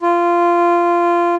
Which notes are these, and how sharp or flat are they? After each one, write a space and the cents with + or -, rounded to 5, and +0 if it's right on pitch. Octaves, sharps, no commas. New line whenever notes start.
F4 -15